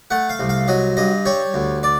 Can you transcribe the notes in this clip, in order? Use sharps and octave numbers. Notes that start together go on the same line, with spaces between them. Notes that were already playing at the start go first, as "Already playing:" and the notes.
A3 F#5
F5
C2
F5
F#3 D#5
G2 D#5
G3 C#5
D2
D5